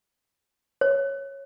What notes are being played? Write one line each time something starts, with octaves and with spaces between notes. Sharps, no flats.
C#5